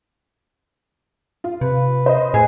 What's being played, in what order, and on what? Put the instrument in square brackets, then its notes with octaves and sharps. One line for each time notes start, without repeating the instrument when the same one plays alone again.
[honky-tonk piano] F4
[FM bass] C3 [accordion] B4
[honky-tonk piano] C5 D#5
[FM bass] A2 [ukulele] G#4